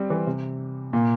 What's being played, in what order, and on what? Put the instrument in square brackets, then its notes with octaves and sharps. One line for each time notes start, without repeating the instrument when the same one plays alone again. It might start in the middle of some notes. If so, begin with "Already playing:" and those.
Already playing: [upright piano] G3 C4
E3
C3
[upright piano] A#2 [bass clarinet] A#3